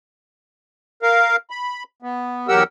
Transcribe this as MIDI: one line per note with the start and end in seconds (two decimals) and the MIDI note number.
1.02 1.36 70
1.02 1.36 77
1.50 1.83 83
2.02 2.48 59
2.48 2.64 40
2.48 2.64 54
2.48 2.64 67
2.48 2.64 70
2.48 2.64 78
2.48 2.64 88